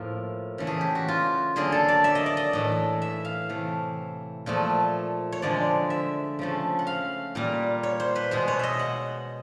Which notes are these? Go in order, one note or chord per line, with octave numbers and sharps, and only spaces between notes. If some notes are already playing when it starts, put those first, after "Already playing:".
Already playing: A2 F3 A#3
C#3 E3 A3
G#4
G4
F#4
F4
D3 F#3 A#3 G#4
A4
D5
E5
D#5
D5
D#5
A2 E3 A3
E5
F5
C3 E3 A3
A#2 F3 A3
C#5
D3 F3 G#3 D5
E5
C#3 F3 A3
F#5
F5
A#2 G3 A#3
C#5
C5
B4
B2 G#3 C5
C#5
D#5 E5
F#5